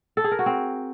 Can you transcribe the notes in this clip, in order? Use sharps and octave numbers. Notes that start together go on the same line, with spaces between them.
A4
G#4
A#4
F#4
C4